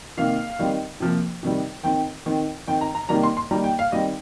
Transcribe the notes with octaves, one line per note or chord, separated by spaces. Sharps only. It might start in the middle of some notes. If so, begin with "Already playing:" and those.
C3 D#3 A#3 F5
D#3 G3 C4
C3 F3 A#3
C3 D#3 G3
D#3 C4 G5
D#3 C4
D#3 C4 G5
A#5
A#5
C3 D#3 G3 A#3 A#5
C6
C6
D#3 G3 A#3 A#5
G5
F5
D#3 G3 C4 D#5